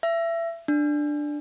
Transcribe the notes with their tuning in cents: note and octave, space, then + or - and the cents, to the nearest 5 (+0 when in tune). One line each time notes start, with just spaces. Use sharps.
E5 +25
D4 +10